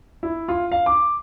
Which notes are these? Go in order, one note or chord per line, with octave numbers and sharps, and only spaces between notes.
E4
F4
F5
D6